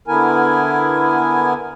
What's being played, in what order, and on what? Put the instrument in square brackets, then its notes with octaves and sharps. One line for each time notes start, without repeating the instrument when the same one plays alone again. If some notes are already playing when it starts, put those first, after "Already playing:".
[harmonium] D3 B3 E4 A#4 G#5